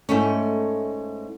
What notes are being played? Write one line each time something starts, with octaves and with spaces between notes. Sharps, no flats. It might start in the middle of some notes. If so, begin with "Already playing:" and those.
G#2 A3 C#4